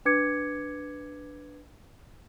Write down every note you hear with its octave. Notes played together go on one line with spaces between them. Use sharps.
D4 B4 D6 G#6 C#7